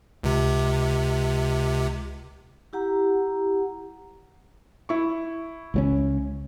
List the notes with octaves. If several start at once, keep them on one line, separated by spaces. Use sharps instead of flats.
C#2 C3
E4 G4 F#5 A#5
E4 C#6
C#2 F3 C#4